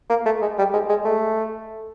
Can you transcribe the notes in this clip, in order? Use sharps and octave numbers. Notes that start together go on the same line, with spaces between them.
A#3
A3
G#3
G3
G#3
G#3
A3